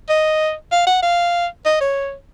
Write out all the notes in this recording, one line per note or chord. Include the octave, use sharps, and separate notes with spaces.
D#5
F5
F#5
F5
D#5
C#5